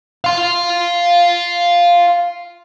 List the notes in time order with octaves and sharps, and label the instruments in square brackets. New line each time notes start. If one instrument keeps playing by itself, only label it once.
[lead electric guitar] F5 C6